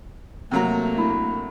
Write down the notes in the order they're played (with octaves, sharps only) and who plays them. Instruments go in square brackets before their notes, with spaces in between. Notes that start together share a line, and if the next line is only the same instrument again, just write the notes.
[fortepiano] C3 F#3 A#5 [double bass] A3 A#3
[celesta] D4 E4 B5